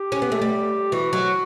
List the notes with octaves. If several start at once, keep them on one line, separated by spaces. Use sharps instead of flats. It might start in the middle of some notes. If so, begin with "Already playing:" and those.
Already playing: G4
C#4
B3
A3
G3
E3 F#4
F#3